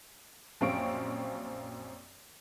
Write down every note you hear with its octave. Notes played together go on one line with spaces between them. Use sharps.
A#1 F#2 C4 F5 C#6 D7